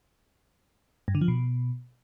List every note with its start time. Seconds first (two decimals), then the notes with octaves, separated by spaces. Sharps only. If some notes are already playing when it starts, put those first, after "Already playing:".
1.08 G2
1.15 D3
1.21 F3
1.28 B2